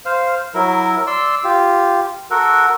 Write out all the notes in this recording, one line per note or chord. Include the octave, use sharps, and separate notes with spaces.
C5 F5
F#3 E4 A#4
D5 C6 E6
F4 G4
F#4 A4 A#4 F#5